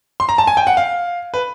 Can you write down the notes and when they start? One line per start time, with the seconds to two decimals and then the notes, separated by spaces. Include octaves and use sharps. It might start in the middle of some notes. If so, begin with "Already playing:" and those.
0.20 C6
0.29 A#5
0.38 A5
0.47 G#5
0.57 G5
0.67 F#5
0.77 F5
1.34 B4